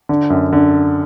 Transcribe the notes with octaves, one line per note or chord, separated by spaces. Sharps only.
D3
F#2
D3